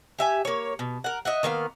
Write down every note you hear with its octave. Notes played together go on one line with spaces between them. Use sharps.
G4 E5 G#5
A#3 C#5
B2
A#4 F#5
D#5 E5 F#5
D#3 A#3 B3 F5